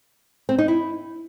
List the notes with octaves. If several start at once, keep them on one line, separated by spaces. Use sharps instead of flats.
C4
D#4
E4